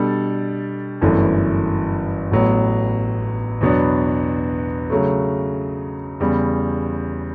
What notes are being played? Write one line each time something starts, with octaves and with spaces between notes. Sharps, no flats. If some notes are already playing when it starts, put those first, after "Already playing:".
Already playing: B2 G3 D4 A4
G1 F#2 E3 A3
A1 A2 F#3 B3
E2 B2 F#3 B3 D4
C#3 F#3 A3
E2 C#3 G3